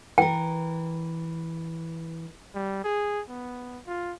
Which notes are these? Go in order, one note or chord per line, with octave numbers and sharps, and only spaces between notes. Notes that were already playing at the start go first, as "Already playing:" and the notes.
E3 A#4 G5
G3
G#4
B3
F4